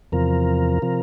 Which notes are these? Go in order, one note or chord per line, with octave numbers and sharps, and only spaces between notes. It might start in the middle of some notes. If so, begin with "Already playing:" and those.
E2 C3 F3 A#4
C3 F3